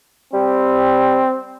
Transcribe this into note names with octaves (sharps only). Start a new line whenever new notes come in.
G3 C4